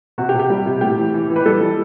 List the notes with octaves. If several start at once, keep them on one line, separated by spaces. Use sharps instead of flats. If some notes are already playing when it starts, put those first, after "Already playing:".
C3 F#4
G4
C3
G4
G3
C3
A2 G4
E3
E3
E3
B4
G3 A4
G3